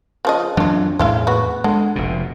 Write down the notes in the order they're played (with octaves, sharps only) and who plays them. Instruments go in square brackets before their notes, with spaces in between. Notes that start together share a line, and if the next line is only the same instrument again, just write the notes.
[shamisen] C#3 F3 D#5
[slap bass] F#2 E3 F#3 [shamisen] D4 F4
[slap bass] E2 A2 [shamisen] G#3 E4 F5
[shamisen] B3 F#4
[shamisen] D3 [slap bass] G#3
[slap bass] F1 B2